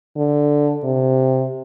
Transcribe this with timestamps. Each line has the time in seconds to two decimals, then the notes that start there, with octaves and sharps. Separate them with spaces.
0.16 D3
0.84 C3